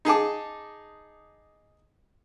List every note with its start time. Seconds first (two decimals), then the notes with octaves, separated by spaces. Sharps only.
0.05 D#4 G#4 A5 D6